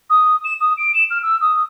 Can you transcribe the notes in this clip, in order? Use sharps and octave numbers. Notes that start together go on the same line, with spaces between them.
D#6
E7
D#6
D7
E7
F6
E6
D#6